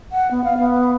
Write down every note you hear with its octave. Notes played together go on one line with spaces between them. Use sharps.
F#5
B3
F5
B3